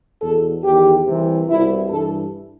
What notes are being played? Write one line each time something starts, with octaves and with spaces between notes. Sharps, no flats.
E2 B2 A4
E2 D#3 G4
C2 C3 E3
C2 B2 E4
G2 E3 A4